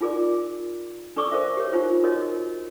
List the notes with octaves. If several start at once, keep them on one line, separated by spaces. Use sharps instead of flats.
D#4 F4 G#4 A#4 D5
D4 A4 D5 C#6 D6 E6
A#4 C5 E5
G4 A#4 C#5
D4 D#4 F4 C5
D#4 F#4 A#4 C#5 D#5